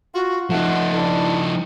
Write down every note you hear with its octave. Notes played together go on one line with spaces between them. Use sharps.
F4 F#4
F3 A3 D#4 F#5
D4 E4